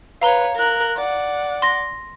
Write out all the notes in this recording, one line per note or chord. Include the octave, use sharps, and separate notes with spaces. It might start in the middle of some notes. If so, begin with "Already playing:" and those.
B4 C#5 F5 A#5 G7
A#4 F#6
D5 F#5
C6 A#6